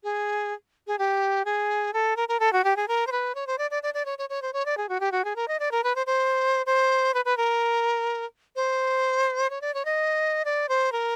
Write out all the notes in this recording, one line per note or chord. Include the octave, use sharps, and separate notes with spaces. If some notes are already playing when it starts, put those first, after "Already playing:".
G#4
G#4
G4
G#4
A4
A#4
A#4
A4
F#4
G4
G#4
A#4
C5
B4
C#5
C5
D5
D5
D5
D5
C#5
C#5
C#5
C5
C#5
D5
G#4
F#4
G4
F#4
G#4
A#4
D#5
D5
A#4
B4
C5
C5
C5
B4
B4
A#4
C5
C#5
D5
C#5
D#5
D5
C5
A#4